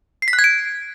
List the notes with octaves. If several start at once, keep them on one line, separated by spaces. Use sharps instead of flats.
C7
B6
F#6
G#6
D7